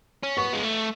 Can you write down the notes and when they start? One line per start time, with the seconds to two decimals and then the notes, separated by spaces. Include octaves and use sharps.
0.23 C#4
0.37 B3 C#6
0.53 G#3
0.63 A3